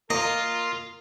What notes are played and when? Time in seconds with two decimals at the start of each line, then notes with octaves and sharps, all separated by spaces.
0.10 A#3 F4 A#4 D#5